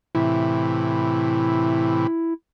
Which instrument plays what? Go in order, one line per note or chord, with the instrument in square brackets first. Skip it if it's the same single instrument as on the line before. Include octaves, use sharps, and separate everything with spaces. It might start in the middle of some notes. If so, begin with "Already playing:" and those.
[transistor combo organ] A2 C3 E3 [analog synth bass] E4